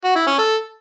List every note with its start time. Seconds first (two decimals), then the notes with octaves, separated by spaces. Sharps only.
0.05 F#4
0.16 E4
0.27 C#4
0.38 A4